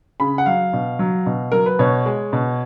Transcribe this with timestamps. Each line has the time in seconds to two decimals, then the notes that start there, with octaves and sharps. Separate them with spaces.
0.20 C#3 B5
0.38 F#5
0.46 F#3 F5
0.73 B2
0.99 F#3
1.26 B2
1.52 F#3 A#4
1.66 B4
1.79 B2 C#5
2.06 G#3
2.33 B2